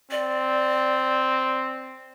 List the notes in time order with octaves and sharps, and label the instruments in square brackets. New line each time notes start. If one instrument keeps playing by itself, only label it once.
[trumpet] C4 [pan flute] D5